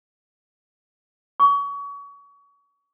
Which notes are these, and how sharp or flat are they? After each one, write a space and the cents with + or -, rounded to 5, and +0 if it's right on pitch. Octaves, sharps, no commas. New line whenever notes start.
C#6 +30